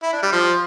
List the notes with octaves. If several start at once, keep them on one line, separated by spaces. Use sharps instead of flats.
E4
D4
G3
F3